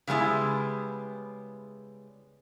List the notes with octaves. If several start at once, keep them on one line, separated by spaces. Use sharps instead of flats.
C#3 G3 G#3 B3 E4